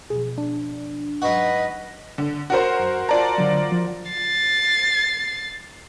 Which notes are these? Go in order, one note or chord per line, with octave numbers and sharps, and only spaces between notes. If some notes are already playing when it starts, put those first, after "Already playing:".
B2 F3 G#4
D4
G#2 F#3 D#4 F#4 B4 D#5
D3
F#4 A#4 C5
F#2
F4 D5 A5 A#5
D3 F#3
F3
A6 C7